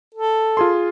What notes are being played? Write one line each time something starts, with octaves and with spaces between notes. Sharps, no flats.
A4
F4 G#4 C6